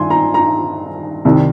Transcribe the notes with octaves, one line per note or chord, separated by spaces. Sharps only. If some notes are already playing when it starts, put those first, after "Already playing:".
Already playing: G2 D#3 G#5 C6
A#5
A#5
C2 C3 D#3 G3